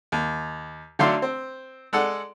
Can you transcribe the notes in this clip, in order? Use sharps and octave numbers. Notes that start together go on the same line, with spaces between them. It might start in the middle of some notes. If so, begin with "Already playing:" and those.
D#2
D3 F#3 A3 D5 F5 C6
C4
G#3 A4 D5 F#5